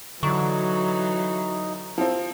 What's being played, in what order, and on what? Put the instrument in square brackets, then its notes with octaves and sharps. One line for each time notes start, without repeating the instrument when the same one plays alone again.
[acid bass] D3 [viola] E3 F#3 [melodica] D#4 [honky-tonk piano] C#6
[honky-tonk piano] F3 C4